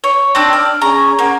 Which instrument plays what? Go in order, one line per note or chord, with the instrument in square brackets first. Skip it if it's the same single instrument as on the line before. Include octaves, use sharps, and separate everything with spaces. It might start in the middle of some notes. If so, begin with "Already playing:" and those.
[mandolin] C#5
[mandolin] C4 D4 [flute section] G5
[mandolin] D5 [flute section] F6
[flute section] C#4 G#4 C#6 [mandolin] A#5
[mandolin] A#3 [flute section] C#4 F#5